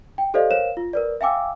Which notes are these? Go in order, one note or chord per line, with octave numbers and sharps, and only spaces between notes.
G5
G4 A4 C5 D5 D#5 F5
A#4 C5 C#5 F5 E7
F4
A#4 B4 D5
E5 F5 G5 G#5 D6 E6